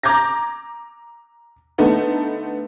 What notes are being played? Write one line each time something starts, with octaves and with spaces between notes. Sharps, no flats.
A#5 D6 G6 G#6 A#6
D3 A3 B3 D#4